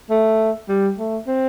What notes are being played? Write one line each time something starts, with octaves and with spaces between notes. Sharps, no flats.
A3
G3
A3
C4